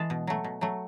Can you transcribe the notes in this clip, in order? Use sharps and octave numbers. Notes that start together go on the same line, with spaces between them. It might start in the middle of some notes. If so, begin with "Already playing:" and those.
Already playing: E3 G#3 A5
B2
F#3 A3
B2
F#3 A3